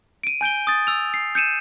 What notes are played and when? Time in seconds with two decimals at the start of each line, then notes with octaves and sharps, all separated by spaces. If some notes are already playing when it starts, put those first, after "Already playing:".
0.24 D7 D#7
0.41 G#5 G6 D7 G7
0.67 D#6 A6
0.87 E6 F7
1.14 C7
1.35 G6 C#7 D#7 E7